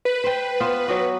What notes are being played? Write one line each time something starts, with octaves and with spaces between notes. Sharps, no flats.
B4
C5 G5
B3 F4 C5
F#3 B3 F#4